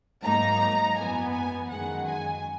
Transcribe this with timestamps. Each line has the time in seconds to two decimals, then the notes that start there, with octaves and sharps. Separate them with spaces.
0.23 G#2 F#3 A#3 D#4 A#5
0.96 F#2 E3 B3 G#5
1.33 G#5
1.69 F#2 D#3 G#3 F#5
2.05 G#5